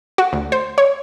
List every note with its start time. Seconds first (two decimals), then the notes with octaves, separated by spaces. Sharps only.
0.18 F#4
0.33 D2
0.52 C5
0.78 C#5